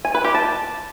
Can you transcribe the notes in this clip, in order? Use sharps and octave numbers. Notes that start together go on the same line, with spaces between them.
G#5
B4
G4
A5